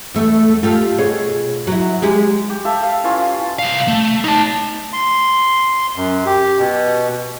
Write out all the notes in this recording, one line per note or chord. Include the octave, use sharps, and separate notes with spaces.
E2 A3
F4 G4 A4
B2 G#4 C#5
F#3 E4
G#3 G4 G#4
G4
A4 E5 F5
F5
E3 C#4 F4
C2 F5
A3
D#4 A5
C6
F#2
G4
B2